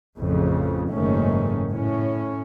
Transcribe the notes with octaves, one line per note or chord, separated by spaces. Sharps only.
A1 F2 C#3
F#1 G#2 D#3 A3 C#4
A2 C#4